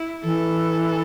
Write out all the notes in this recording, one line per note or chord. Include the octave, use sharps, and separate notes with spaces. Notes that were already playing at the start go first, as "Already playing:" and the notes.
Already playing: E4
E3 A4